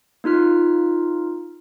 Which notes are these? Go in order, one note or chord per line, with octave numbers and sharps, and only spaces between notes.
A#3 D#4 F4 F6